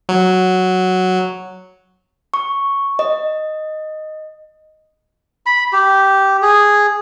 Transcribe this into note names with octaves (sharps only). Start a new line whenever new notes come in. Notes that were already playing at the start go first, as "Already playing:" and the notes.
F#3
C#6
D#5
B5
G4
G#4